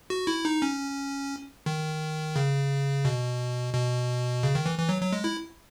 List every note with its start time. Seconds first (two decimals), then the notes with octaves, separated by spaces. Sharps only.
0.10 F#4
0.27 E4
0.45 D#4
0.62 C#4
1.66 D#3
2.36 C#3
3.05 B2
3.74 B2
4.43 C#3
4.55 D#3
4.66 E3
4.78 E3
4.89 F#3
5.01 F#3
5.13 G#3
5.24 E4